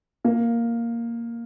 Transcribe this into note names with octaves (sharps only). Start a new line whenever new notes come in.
A#3